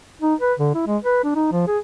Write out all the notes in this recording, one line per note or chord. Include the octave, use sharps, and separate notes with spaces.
D#4
B4
D3
E4
G#3
B4
D4
D#4
F3
G#4